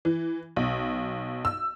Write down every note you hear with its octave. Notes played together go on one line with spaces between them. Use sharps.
E3
B1
E6